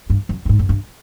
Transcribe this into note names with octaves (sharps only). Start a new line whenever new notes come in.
G2
F#2
G2
G#2
F#2
G2